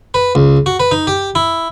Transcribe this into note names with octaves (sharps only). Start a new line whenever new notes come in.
B4
C#2
F#4
B4
D#4
G4
E4